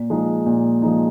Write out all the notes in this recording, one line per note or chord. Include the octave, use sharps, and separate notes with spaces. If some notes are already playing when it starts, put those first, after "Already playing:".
Already playing: A#2
F3 G#3 D#4
A#2
F3 G#3 D#4